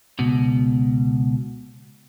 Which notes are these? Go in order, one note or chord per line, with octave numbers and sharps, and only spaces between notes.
C#2 B2